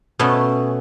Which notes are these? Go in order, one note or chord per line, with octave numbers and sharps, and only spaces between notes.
B2 A3 B3 C#4